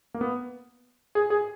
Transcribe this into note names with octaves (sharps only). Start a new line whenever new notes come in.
A#3
B3
G#4
G#4